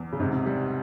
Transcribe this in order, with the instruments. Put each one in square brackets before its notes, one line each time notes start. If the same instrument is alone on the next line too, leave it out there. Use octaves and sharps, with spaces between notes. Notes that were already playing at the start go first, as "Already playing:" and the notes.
Already playing: [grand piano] E2
[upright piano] C#3
[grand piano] G#2 [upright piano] C3
[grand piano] G3